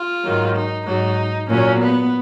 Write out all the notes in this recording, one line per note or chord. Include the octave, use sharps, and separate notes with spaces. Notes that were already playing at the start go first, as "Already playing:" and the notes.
Already playing: F4
G#2 D#3 F#3
D#4
G#2 F#3 D#4
A#2 F#3 C#4
B3